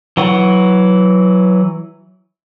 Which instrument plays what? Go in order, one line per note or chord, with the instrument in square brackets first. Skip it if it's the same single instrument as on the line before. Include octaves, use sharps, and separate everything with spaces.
[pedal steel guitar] E3 F#3 F#5 C#6